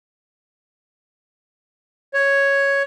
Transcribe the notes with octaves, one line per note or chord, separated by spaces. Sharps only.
C#5